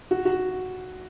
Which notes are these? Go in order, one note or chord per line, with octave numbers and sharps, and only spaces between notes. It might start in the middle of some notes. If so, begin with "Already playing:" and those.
F#4
F#4